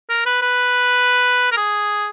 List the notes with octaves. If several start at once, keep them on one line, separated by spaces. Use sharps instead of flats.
A#4
B4
B4
A#4
G#4